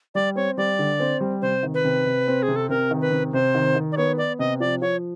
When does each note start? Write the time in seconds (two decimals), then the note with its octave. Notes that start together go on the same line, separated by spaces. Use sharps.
0.15 G3 D5
0.35 C4 C#5
0.57 G3 D5
0.79 D3
1.00 C4
1.21 G3
1.42 C3 C5
1.63 D#3
1.74 B4
1.84 C3
2.06 C3
2.27 C4
2.43 G#4
2.48 C3
2.56 A4
2.69 C3 A#4
2.91 D#3
3.01 B4
3.12 C3
3.33 C3 C5
3.54 D#3
3.75 D#3
3.92 D5
3.97 B3 C#5
4.18 B3 D5
4.39 C3 D#5
4.60 F3 D5
4.81 F3 C#5